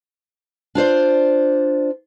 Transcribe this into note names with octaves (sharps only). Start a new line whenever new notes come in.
D4 F4 C5 D5